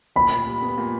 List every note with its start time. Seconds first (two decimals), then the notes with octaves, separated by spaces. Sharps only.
0.16 A#2 B5
0.31 A#2
0.47 G3
0.62 B3
0.78 A#2